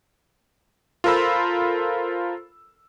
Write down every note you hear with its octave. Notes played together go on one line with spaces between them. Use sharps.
F4 A4 A#4 C5 B5 E6